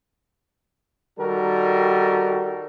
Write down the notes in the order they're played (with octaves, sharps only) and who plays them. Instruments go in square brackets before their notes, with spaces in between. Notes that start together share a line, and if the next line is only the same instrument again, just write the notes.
[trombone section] D#3 G3 F#4 A4 A#4